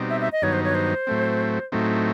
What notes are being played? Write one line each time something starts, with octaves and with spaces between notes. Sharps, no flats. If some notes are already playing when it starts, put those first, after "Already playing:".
Already playing: B2 G3 C4 D#4
E5
E5
D#5
G2 D#3 F#3 B3 D#4 C#5
C5
C#5
C5
A2 F#3 A3 C4
A2 F#3 A3 C4 D#4